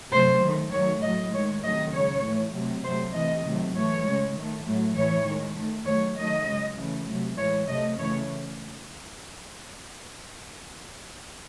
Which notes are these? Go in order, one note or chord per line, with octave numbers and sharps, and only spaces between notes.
C3 F#3 A3 C5
D#3 A3
D#3 F#3 A3 C#5
A2 F#3 A3 D#5
D#3 G#3 C#5
C3 D#3 F#3 A3 D#5
C#3 G#3 C#5
A2 E3 A3
C3 F#3 A3
C3 F#3 A3 C5
C3 E3 A3 D#5
C3 D#3 F#3 A3
A2 E3 A3 C#5
C#3 G#3
D#3 A3
A2 F#3 A3
A2 E3 A3 C#5
D#3 G#3
D#3 A3
D#3 F#3 A3 C#5
D#3 F#3 A3 D#5
C#3 G#3
C#3 E3 A3
C3 F#3 A3
A2 E3 G#3 C#5
C3 F#3 A3 D#5
C#3 E3 A3 C#5